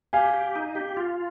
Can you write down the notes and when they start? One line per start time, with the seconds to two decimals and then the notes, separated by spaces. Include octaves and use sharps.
0.13 G4 F5 G#5
0.34 G4
0.56 D#4
0.75 G4
0.97 F4